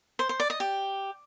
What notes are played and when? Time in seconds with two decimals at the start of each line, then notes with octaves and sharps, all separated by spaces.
0.19 C5
0.29 C5
0.40 D5
0.50 D#5
0.60 G4